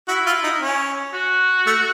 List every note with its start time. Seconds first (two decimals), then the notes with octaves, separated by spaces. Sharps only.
0.08 E4 F#4
0.26 F4
0.44 D#4
0.61 C#4
1.14 F#4
1.66 A3